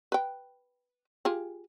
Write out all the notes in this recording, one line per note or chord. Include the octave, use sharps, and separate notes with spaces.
B4 G5
F4 G4 G#4